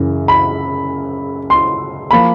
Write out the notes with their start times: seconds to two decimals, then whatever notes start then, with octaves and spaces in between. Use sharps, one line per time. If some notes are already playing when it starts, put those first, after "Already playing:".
Already playing: F#2 C#3 E3
0.28 B5
1.50 C6
2.11 F3 A#3 B5